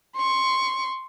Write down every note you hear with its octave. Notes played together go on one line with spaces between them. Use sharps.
C6 C#6